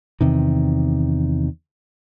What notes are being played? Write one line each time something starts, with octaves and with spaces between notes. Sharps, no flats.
E2 C3 D#3